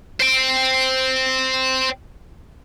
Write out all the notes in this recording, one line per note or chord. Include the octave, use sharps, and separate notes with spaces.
C5 G5